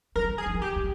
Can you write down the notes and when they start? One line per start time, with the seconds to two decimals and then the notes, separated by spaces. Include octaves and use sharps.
0.16 G3 A#4
0.38 G#4
0.46 F3
0.62 G4
0.76 G#3